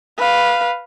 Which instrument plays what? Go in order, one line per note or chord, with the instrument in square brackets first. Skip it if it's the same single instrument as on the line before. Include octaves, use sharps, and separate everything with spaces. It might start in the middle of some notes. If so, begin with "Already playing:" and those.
[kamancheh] B4 F5